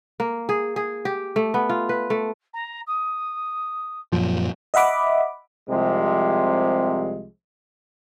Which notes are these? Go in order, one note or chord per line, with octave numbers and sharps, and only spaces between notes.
A#3
G#4
G#4
G4
A3
B3
F4
B4
A3
A#5
D#6
F#2 A#2 F3
D#5 E5 F#5 B5 D6
C2 C3 F3 G#3